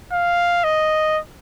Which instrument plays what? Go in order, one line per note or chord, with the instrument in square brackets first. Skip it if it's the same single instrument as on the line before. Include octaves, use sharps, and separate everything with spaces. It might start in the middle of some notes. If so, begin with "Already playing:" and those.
[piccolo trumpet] F5
D#5